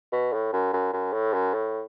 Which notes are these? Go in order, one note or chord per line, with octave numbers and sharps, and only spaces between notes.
B2
A2
F#2
F#2
F#2
A2
F#2
A2